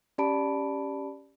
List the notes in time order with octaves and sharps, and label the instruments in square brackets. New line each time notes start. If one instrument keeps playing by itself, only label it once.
[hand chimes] C#4 G4 D5 A5 B5 D7